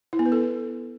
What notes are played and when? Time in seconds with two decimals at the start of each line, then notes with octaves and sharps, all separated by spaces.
0.13 E4
0.19 B3
0.26 B4
0.32 A4